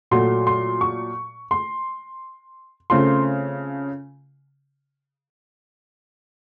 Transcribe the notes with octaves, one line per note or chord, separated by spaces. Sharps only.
A#2 F#3 A3 C6
C6
C#6
C6
C#3 A3 C4 F4 C6